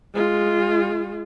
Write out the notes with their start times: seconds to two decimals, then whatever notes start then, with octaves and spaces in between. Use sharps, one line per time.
0.14 G#3 F4